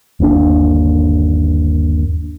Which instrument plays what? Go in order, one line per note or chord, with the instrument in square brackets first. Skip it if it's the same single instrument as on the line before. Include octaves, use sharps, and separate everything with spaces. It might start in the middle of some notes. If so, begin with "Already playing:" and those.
[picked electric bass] G1 D#2 A#3 D4